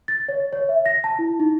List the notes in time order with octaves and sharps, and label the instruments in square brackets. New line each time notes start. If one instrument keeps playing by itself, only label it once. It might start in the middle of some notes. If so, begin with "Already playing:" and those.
[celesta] A6
C#5
C#5
E5
A#6
A5
E4
D#4